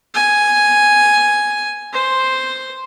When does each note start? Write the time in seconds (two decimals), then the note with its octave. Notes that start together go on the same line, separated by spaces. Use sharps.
0.14 G#5
1.93 C5